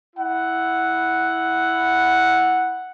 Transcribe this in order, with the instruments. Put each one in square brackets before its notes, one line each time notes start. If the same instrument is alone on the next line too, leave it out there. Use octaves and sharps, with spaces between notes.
[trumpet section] E4 F#5